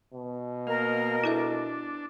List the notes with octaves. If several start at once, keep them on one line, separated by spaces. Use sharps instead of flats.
B2
A#3 A#4 D#5 F5
D4 E4 A4 E5